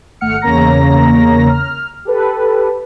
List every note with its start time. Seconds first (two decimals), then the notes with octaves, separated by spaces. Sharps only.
0.21 G#1 A3 F#5 F6 C#7
0.42 E2 C#3 A#3 C#5 A#5 A#6
1.49 F6
2.05 G4 A4 B4